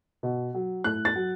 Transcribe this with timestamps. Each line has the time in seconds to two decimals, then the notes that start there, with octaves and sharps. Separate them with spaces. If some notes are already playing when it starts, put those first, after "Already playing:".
0.23 B2
0.54 F#3
0.84 A2 F#6
1.05 A6
1.15 F#3